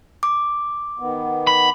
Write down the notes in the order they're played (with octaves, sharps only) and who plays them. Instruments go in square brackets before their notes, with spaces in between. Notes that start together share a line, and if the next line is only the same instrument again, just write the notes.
[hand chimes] D6
[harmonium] D#3 B3
[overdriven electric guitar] B5